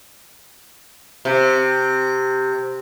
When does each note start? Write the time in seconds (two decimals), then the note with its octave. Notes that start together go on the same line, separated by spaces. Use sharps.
1.25 C3